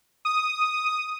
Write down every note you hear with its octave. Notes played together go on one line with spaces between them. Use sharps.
D#6